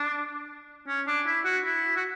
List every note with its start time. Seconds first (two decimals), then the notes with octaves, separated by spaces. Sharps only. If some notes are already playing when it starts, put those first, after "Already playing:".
Already playing: D4
0.88 C#4
1.07 D4
1.26 E4
1.45 F#4
1.65 E4
1.97 F#4